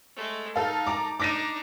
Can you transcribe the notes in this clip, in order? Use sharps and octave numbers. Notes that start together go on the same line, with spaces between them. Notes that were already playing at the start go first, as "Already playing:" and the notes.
G#3 A3
D#4 A4 F5
A5 A#5 D6
D4 D#4 D6 A#6 D#7